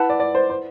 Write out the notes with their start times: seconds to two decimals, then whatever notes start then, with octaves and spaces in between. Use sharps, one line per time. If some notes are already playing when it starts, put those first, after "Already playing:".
Already playing: E4 B4 F#5 A5
0.10 D5
0.20 D5
0.35 C5
0.50 C5